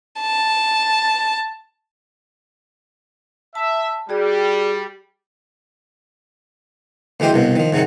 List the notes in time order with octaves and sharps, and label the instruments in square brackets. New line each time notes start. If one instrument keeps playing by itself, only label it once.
[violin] A5
[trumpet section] E5 [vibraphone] A5
[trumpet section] G3 [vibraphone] F#4 G#4 D5
[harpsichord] D2 E3 G#3 G4 C5
C2 G2 B2
D#3 F3
G#2 C3 D#3 F#3